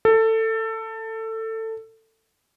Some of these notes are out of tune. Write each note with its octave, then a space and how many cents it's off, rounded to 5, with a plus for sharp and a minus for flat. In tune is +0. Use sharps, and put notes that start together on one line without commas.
A4 +20